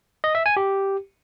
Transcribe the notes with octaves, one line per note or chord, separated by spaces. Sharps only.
D#5
E5
G#5
G4